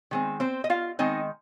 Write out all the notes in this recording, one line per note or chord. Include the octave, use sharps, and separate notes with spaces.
D#3 G#3 C4
C4 C5
D#5
F4 F5
D#3 G#3 C4 D#4 D#5